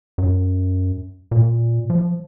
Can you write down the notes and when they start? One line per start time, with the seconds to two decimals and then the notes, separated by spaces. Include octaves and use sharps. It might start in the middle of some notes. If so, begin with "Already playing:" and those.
0.18 F#2
1.31 A#2
1.90 F3